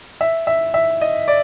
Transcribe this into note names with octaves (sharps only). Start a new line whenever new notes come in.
E5
E5
E5
D#5
D5